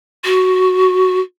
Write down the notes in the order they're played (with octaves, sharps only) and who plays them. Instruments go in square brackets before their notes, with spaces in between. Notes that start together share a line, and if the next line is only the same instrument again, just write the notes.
[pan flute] F#4